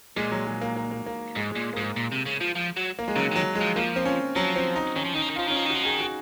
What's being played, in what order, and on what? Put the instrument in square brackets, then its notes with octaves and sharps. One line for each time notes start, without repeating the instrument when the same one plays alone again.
[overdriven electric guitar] A#2 [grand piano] G#3
[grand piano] F#3
G#3
A#3
A#3
A#3
A#3
[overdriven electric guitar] G#2 [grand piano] G#3
[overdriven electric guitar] A#2 [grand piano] G#3
[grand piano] A#3
[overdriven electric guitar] G#2 [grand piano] G#3
[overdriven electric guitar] A#2
C3
C#3
F3
F3
F#3
[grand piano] A#3
G#3
[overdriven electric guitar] C#3 [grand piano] F#3
[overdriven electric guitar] D#3 [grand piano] F#3
[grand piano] G#3
[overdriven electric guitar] F3
[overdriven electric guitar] F3 [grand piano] A#3
[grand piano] C4
C#4
[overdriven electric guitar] F3 [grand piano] F#3
[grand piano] C4
D#4
[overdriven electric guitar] D#3 [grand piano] C#4
[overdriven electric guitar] F3
[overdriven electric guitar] D#3 [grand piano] D#4
[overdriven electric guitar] F3
D#3
[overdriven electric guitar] F3 [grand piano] F4
[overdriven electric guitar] D#3 [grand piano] C#4
[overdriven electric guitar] F3 [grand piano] D#4
[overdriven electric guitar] D#3
[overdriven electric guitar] F3 [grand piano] F#4
[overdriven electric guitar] D#3 [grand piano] G#4
[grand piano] F#4